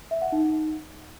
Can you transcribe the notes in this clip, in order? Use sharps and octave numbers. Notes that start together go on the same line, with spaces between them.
E5
F#5
D#4